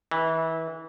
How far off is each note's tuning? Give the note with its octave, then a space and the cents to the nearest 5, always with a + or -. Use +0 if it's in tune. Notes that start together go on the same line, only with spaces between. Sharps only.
E3 -25